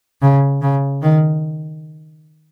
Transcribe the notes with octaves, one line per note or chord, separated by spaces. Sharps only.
C#3
C#3
D#3